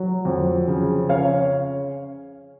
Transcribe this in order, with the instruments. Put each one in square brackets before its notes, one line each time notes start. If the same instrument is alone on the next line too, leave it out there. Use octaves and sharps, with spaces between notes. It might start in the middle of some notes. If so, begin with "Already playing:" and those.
Already playing: [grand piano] F#3
F2
C#3
C#4 C#5 F5